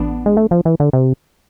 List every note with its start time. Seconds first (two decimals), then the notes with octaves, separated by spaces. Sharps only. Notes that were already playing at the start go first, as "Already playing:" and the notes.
Already playing: A1 B3 D4
0.26 G#3
0.37 A3
0.51 F3
0.65 E3
0.80 D3
0.93 C3